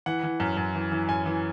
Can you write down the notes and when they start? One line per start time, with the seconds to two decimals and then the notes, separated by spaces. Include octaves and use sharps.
0.06 E3 F#5
0.24 E3
0.40 F#2
0.57 F#2
0.75 E3
0.92 E3
1.09 F#2 G#5
1.26 E3